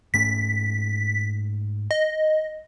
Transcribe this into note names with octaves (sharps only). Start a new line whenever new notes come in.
G#2 A3 C#4 B6
D#5